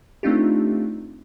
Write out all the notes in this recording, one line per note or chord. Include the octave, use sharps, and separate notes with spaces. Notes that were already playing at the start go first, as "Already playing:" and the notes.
A3 C4 D4 D#4 F4 G4